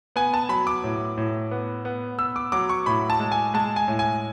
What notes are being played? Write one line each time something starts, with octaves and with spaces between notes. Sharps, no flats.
B3 G#5
A5
F#3 B5
D6
A2
A2
B3
B3
B3 E6
D6
F#3 D6
C#6
A2 B5
A5
G#3
G#5
G#3 A5
G#5
A2
G#5